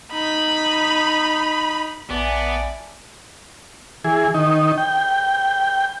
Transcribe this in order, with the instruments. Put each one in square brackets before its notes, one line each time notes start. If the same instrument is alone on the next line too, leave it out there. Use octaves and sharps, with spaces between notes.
[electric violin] D#4 B5
[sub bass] A#1 [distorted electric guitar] B3 [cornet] D5 [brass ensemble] E5 G#5 A5
[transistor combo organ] E3 G#4
D#3 D#4
G5